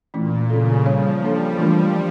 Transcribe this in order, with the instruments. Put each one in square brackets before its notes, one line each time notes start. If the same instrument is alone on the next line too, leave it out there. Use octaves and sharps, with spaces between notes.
[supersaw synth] A#2 [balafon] E3 A3 C#4 E4
[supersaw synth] C#3 [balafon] C#4 F4 A4
[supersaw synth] F3 [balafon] G3 C#4 F4 C#5
[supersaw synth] G3 [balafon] A#3 D4 A4 C#5
[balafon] E3 A3 D4 F4 A#4
F3